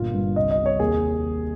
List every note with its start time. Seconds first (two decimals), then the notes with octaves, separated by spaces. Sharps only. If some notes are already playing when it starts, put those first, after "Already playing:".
Already playing: G1 A#2 F4
0.14 G2
0.36 C2 D#5
0.51 D#5
0.58 C3
0.66 C#5
0.80 D#2 G#4